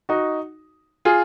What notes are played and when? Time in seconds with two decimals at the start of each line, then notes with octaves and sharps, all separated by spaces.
0.09 D#4 F#4
1.05 F4 G#4